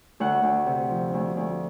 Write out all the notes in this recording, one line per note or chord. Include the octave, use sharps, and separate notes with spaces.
D2 F#5
D2
C3
F3
D2
D2